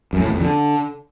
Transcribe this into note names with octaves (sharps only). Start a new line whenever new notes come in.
F#2
A2
E2
F2
D3